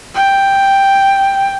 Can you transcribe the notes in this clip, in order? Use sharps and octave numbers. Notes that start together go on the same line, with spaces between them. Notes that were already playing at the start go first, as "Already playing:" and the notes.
G5